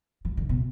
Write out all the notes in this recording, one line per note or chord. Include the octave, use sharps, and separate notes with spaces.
E3
D3
B2